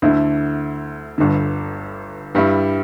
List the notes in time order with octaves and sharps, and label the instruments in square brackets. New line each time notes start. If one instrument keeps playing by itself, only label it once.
[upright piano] D2 D3 A3 E4
G1 G2 D3
G2 G3 E4